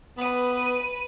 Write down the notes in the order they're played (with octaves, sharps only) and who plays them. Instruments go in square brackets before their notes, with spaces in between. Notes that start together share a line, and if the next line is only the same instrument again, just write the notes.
[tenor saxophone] B3 [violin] B4 D#7